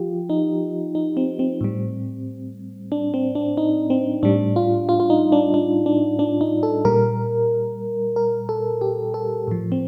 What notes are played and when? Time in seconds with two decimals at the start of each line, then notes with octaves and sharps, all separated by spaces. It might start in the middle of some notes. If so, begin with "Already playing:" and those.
Already playing: F3 F4 G4
0.30 D#4
0.95 D#4
1.17 C4
1.39 C4
1.61 A2 G3
2.92 D4
3.14 C4
3.35 D4
3.57 D#4
3.90 C4
4.23 A2 G3 D4
4.56 F4
4.89 F4
5.00 F4
5.10 D#4
5.32 D4
5.54 D4
5.86 D4
6.19 D4
6.41 D#4
6.63 A4
6.85 A#2 G3 A#4
8.16 A#4
8.49 A4
8.81 G4
9.14 A4
9.47 A2 F3
9.72 C4